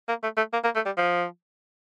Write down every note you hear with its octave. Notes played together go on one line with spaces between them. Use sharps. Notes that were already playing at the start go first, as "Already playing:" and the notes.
A#3
A3
A3
A#3
A#3
A3
G3
F3